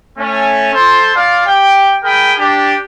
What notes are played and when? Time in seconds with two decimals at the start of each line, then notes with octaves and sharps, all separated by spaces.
0.18 A3 C#4
0.73 A4 C5
1.15 F4 D5 F5
1.46 G4 G5
2.03 G#4 A#4 G5 B5
2.38 D4 G4